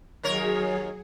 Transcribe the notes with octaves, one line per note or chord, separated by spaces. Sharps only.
D#2 F#3 G#4 A#4 C#5